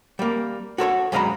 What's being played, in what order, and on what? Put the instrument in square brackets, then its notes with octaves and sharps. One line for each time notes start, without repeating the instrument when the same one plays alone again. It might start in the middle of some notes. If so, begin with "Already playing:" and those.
[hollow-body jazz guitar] G3 A#3
F#4 A4 C5 C#5
F#2 G#3 D#5 F5 A#5 B5